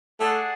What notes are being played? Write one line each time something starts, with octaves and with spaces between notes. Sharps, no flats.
A3 D4 G#4 D5 F#5